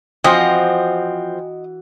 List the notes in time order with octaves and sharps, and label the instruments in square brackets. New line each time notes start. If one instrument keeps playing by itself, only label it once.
[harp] E3 F#4 [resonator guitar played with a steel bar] F3 C4 [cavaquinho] D#5 [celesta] G5 G#5